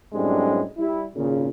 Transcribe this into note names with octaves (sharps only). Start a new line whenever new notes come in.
F#2 A2 G3 G#3 C4 D4
G3 E4
G#1 A#2 C#3